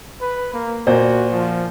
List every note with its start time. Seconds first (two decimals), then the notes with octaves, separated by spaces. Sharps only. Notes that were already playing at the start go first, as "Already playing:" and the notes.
0.21 B4
0.53 A#3
0.87 A#2 F#4 C5
1.32 F3